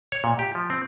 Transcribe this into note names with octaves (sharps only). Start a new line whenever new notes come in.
C#5
A#2
G4
F3
C4